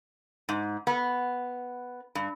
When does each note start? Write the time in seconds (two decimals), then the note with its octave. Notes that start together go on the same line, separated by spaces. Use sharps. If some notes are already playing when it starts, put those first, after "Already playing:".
0.49 G#2
0.87 B3
2.15 G2